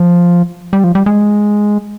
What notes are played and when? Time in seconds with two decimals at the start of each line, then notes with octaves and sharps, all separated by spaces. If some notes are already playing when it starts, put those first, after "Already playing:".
Already playing: F3
0.73 G3
0.84 F3
0.95 G3
1.06 G#3